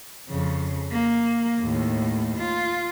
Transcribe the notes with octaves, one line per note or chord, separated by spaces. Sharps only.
F2 C#3
A#3
D#2 A2
F4